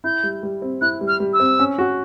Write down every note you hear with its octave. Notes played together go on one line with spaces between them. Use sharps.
E4 G6
G3
G3
C4
E4 F#6
G3
F6
G3
E6
C4
C#4
F#4